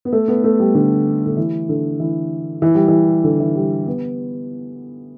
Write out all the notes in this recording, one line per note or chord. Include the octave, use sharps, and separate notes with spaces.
B3
A3
B3
A3
G3
D3
D3
E3
D3
E3
E3
G3
E3
D3
E3
G3
B3